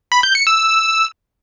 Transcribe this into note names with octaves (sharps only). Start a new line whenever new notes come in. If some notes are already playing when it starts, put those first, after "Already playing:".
B5
G6
C#7
E6